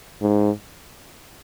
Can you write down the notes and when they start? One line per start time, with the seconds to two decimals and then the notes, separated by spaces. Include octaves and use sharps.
0.22 G#2